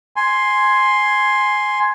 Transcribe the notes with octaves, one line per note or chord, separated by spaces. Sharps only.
G#5 C6